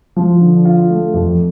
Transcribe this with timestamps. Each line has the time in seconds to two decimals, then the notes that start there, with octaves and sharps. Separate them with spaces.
0.16 F3
0.41 D3
0.65 F4
0.90 A3
1.14 F2